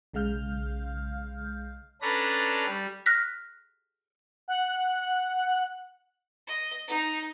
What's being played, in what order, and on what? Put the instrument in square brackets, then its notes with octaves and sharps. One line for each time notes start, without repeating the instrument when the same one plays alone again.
[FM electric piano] B1 C#3 G#3 F5 F6 G6
[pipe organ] C#4 D4 A4 B4 A#5
G3
[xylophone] F6 F#6 A#6 B6
[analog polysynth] F#5 F#6
[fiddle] D#5
D#4